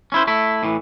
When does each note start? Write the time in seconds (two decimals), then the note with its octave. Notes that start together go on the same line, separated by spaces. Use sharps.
0.12 C#4 E4 C5
0.27 A3 E4
0.63 A2 E3